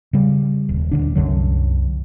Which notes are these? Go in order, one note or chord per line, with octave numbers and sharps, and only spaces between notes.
C#3 G3
D#1
D#1 D3 D4
C2 F#2 D3 F#3